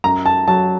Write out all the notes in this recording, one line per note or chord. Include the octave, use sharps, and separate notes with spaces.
F#2 A#5
A5
F#3 A5